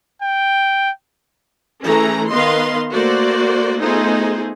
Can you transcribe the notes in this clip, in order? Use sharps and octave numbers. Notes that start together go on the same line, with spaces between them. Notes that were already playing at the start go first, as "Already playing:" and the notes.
G5
E3 A3 C#4 G#4 A4 A#5
D#3 B3 B4 D#5 F5 C6
A3 A#3 F#4 C5 D5
A3 B3 D#4 F4 G#4 C5